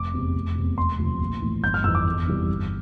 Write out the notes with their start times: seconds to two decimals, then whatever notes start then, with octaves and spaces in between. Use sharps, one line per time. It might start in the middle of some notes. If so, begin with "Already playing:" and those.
Already playing: F1 D6
0.14 E2 C3
0.35 F1
0.55 E2 C3
0.78 E1 C6
0.98 D2 C3 F3
1.21 A#1
1.42 A2 E3
1.63 G1 G6
1.74 F6
1.84 F2 E3 E6
1.95 D6
2.06 E2
2.27 C3 E3 G3
2.49 G1